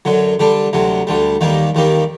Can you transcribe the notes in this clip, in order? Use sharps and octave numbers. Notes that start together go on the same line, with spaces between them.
F#2 D3 F#3
D3 G3 D4
D2 C3 F#3
D2 D3 G3
D#2 D#3 G3 A#3
D#2 D#3 G3 A#3